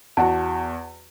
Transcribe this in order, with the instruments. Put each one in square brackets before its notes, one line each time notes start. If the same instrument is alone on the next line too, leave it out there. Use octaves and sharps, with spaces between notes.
[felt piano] E2 F#4 [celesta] F#5 A5